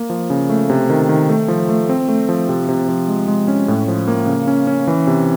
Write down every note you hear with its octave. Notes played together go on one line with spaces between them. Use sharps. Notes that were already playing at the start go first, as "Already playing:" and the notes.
Already playing: A#3
F3
C#3
A3
C3
D#3
D#3
A3
F3
A3
C4
A3
F3
C3
C3
F3
G#3
G#3
C#4
A2
F3
A#3
C#3
C#4
C#4
E3
C3